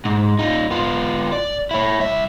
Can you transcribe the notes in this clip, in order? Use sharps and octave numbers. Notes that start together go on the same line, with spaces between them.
G#2
D#4 F4
B3 F4
D5
E4 C#5
C2 E5